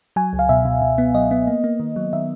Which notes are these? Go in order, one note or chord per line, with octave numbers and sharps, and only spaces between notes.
F#3 G#5
C#2
F5
B2 E5
B2
B2
B3
F#3 D#5
B3
A#3
A#3
D#3
F#3
D#3 E5